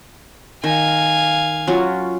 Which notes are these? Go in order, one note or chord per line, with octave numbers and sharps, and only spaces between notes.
D#3 F5 G#5
F#3 C#4 F4